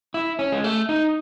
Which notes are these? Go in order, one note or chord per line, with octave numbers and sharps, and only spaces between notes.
E4
C#4
G#3
A3
D#4